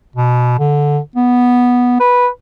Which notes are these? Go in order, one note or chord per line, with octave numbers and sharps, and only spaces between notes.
B2
D3
B3
B4